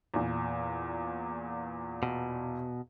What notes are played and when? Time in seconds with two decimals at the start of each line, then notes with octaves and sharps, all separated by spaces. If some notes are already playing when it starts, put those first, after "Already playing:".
0.14 E2 A#2
2.03 B2